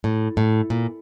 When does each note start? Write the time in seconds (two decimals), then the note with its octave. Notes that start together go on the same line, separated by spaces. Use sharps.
0.04 A2
0.37 A2
0.70 A#2